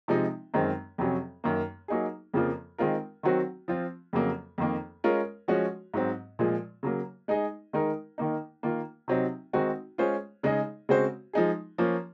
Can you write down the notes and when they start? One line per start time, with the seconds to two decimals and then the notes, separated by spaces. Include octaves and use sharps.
0.08 C3 F3 G#3 D#4
0.54 F#2 D#3 G#3 C4
0.98 F2 C3 F#3 C#4
1.44 F#2 D#3 A#3
1.88 F#3 A#3 D#4 G#4
2.34 F2 C#3 F3 A#3 F4
2.78 D#3 G#3 C4 F4 A#4
3.23 D#3 F#3 C4 F#4
3.68 F3 C4 F4
4.13 F2 C#3 F#3 A#3
4.58 F2 D#3 A#3
5.04 G#3 C#4 F4 A#4
5.48 F3 G#3 C#4 F#4
5.94 G#2 F#3 C4
6.39 A#2 F3 G#3
6.83 C#3 F#3 A#3
7.28 G#3 D#4 G#4 D#5
7.73 D#3 G#3 D#4 A#4
8.18 D#3 A#3 D#4
8.63 D#3 A#3 F4
9.08 C3 F#3 C4 D#4
9.53 D#3 G#3 C4 D#4 F#4
9.98 G#3 C#4 F4 G#4 C5
10.43 C#3 G#3 D#4 G#4 D#5
10.89 C#3 G#3 C4 F#4 C5
11.33 F3 G#3 D#4 G#4
11.78 F3 A#3 C#4